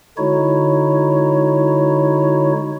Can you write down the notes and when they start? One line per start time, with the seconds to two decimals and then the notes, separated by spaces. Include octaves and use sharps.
0.18 D3 G#3 D#4 E4 F#4 C#5